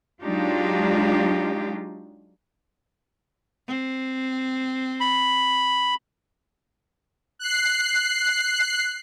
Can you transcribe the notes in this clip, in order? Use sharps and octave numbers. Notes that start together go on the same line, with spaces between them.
F#3 G#3 D4 D#4 F4 G4
C4
B5
F#6 C7